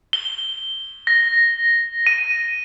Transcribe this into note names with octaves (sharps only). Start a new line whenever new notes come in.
G7
A#6
D#7